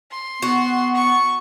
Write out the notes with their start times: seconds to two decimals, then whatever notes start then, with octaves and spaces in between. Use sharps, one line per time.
0.11 C6
0.42 B3 F#4
0.95 C#6